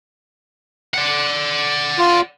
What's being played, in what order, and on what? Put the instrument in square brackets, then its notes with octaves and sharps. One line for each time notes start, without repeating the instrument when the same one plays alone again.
[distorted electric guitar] D5 F#5
[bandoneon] F4